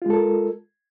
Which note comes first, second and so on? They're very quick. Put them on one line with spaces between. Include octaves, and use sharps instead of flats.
F4 G#3 A4 A#4